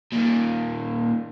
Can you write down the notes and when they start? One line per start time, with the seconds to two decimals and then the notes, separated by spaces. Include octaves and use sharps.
0.12 A#2 D#3